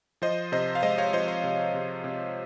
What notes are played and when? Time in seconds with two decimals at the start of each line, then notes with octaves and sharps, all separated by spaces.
0.22 F3 C5 D#5
0.52 C3 C5 D#5
0.75 F5
0.82 G#3 C5 D#5
0.98 C#5 F5
1.13 F3 C5 D#5
1.28 C5
1.44 C3
1.74 C3
2.04 C3